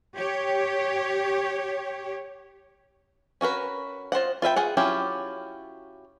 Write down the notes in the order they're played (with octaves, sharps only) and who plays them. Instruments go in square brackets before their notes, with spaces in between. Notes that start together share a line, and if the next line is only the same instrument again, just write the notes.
[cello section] G4 C#5
[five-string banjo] C#4 F#4 A#4 B4
F4 C5 D#5 F#5
F4 B4 E5 G5
F4 G#4 F#5
F#3 C#4 E4 F4 G4